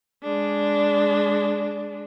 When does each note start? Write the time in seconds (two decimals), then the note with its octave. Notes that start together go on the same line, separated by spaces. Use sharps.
0.23 G#3 D4